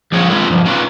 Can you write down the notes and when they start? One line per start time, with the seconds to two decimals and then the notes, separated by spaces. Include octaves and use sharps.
0.12 F2 F3 G#4 C#5
0.30 D#3 G#3 D#4 F4 A4 B4
0.50 G2 F3
0.66 C#4 D#4 F4 B4 D5